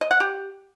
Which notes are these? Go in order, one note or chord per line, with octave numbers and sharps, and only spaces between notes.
D#5
F#5
G4